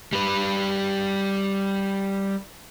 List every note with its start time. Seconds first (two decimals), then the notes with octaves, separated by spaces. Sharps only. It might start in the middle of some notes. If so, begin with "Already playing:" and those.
0.13 G3 B4